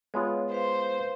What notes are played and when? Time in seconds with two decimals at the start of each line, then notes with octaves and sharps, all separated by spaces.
0.14 G#3 B3 F4 C#5
0.52 B4 C5 F5